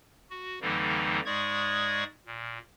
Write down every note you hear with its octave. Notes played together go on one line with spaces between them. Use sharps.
F#4
F2 D3 E3 G3 A#3 D#4
G#2 G#3 D5 C#6 D#6 G#6
A#2